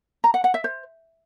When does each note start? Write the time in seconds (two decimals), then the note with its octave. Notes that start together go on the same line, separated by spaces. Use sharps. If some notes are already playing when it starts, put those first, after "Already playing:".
0.24 A#5
0.34 F#5
0.44 F#5
0.54 E5
0.64 C5